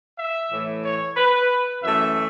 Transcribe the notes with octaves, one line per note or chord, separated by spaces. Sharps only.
E5
A2 E3 A3
C#5
B4
F#2 E3 A3 E5